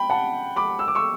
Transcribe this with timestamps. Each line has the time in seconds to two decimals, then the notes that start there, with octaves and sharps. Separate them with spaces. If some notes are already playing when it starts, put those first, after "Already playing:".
Already playing: G5 B5
0.10 F#5 A5
0.56 B5 D6
0.79 E6
0.88 D6
0.95 C#6 E6